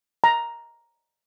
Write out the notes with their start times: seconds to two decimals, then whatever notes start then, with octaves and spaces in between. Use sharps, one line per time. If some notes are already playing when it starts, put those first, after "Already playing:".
0.24 A#5